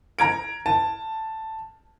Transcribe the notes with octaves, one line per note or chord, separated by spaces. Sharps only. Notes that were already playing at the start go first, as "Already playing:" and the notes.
A#5 G#6 D7
A5